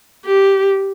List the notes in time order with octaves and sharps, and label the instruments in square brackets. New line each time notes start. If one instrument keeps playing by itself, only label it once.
[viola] G4